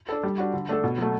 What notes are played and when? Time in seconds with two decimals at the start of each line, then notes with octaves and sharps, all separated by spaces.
0.09 D4 A4
0.23 G3
0.38 D4 F#4
0.54 D3
0.69 A3 D4 A4
0.84 B2
0.98 F#3 A3